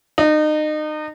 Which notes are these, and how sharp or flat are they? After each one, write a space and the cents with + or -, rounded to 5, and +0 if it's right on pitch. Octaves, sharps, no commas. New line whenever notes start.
D#4 -30